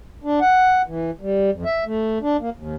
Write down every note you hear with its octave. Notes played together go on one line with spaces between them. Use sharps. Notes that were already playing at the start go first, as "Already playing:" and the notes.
D4
F#5
E3
G3
F2
E5
A3
D4
A#3
D#2